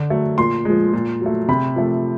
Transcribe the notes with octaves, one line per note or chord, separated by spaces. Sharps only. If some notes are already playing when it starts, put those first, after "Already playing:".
Already playing: D3
F#3 A3
A#2 C6
F3 G#3
A#2
F#3 A3
C3 B5
F3 A3